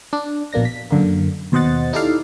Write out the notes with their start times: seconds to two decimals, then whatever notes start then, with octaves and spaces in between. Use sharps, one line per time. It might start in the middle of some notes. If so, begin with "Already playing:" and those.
0.13 D4
0.53 A#1 B2 A#3 D4 A#6
0.65 B6
0.91 F#2 D3 A#3
1.52 D#2 B2 C5 D#5 F#5 A6
1.93 D#4 E4 G4 A4 D5 F5